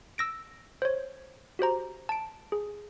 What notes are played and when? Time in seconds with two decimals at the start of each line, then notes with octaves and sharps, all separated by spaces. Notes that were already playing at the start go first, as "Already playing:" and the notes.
0.18 E6 A#6 D7
0.82 C5 C#5
1.59 F#4 G4 C5 A#5
2.09 A5 D7
2.52 G#4